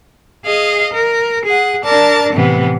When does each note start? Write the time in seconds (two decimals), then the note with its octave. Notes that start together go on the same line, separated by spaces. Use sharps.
0.44 G#4 D#5 F5
0.93 A#4
1.45 G#4 F#5
1.83 D4 A#4 D5 A5
2.33 A2 C3 E3 B3